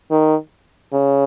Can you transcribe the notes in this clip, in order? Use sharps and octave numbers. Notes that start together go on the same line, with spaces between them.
D#3
C#3